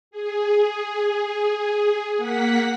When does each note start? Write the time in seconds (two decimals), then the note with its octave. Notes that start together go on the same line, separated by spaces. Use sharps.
0.11 G#4
2.17 A#3 F#5 B6